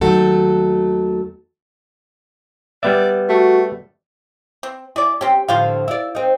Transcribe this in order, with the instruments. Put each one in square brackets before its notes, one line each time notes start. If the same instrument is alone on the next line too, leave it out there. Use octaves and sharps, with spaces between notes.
[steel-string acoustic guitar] D#2 D#3 F#3 A3 F#4 A4
[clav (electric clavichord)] G3 B3 E5 [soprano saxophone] D5
[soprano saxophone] A3 [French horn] F#4
[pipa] C4
[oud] E4 [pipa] G#4 D5
[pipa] C4 C#4 [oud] G4
[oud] A2 D3 F3 [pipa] F4 C5 F5
[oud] E4 D5
C4 D#4